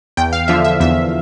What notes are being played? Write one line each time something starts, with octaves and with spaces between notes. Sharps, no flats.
E2 G5
F5
D3 F3 E5
E5
E2 E5